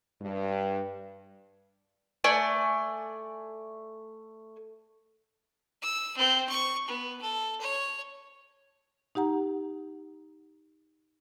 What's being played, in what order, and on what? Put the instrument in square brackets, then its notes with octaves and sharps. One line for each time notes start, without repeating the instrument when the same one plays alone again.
[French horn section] G2
[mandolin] A3 D5 G#5
[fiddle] E6
C4
C#6
B3
A4
C#5
[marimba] D#4 G4 F#5 A#5